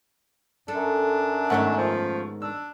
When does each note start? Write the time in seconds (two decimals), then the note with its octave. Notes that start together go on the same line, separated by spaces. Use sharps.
0.68 F#2 D4 A4
1.50 G#2 D#3 A3 B3 C#4 F#5
1.78 F3
2.42 D4 E6